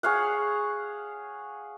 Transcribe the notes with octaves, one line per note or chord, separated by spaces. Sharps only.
G#4 C#5 F5 F#5